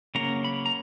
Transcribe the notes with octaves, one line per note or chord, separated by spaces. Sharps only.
C#3 F#3 A#3 C#4 A#5
B5
A#5